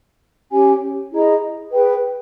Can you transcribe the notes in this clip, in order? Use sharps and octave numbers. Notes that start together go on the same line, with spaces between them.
C#4 G4 C#5 G#5
E4 G#4 D#5 A#5
G#4 B4 G5